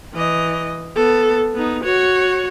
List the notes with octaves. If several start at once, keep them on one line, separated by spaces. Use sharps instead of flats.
E3 D#5
B3 A4
B3 D#4
F#4 C#5